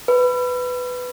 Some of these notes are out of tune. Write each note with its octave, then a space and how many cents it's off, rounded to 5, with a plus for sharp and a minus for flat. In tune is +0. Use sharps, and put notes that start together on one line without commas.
B4 +10